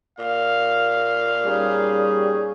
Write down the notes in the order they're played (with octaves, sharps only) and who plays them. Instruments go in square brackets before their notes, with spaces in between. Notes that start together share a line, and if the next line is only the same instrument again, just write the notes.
[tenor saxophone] A#2 [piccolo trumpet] F5
[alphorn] G3 [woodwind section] C#4 D#4 G#4